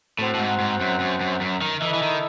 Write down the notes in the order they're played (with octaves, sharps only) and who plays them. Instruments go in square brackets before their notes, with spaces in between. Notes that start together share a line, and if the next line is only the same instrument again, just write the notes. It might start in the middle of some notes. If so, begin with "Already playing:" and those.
[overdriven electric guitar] A2 [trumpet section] C4 F#4 C5 F#5
[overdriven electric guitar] A2
G#2
G#2
F#2
F#2
F#2
F#2
D#3
[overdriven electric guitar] E3 [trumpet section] E4 A4 D#5
[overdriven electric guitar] E3
D#3